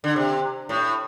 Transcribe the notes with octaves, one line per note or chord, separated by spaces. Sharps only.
D3
C3
A2